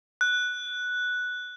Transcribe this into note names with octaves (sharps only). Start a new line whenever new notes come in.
F#6